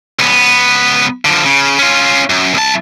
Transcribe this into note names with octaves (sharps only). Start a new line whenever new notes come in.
C#2 B3
D3 F3
C#3
C#4 F4
F#2
C2 A5